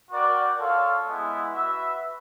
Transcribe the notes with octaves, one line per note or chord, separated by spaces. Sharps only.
F#4 A#4 D5 G5
F4 A4 C#5 F5
G#3 B3 E4
F#4 B4 E5